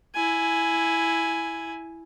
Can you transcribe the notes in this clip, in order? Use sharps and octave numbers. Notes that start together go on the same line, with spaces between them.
E4 G#5